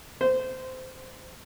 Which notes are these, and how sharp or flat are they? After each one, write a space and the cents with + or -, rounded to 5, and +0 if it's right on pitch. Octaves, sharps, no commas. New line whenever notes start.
C5 -20